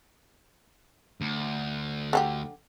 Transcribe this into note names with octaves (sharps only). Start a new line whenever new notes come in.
D2
D3 C#4 G4